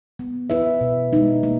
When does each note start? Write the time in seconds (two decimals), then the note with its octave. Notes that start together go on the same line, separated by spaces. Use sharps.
0.19 B3
0.50 E4 B4 E5
0.81 B2
1.13 G#3 D#4
1.43 A#3